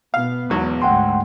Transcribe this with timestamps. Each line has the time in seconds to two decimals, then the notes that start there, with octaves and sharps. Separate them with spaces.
0.14 B2 B3 F5
0.50 G#1 E2 F#3
0.82 D2 G#2 F#5 G5 C6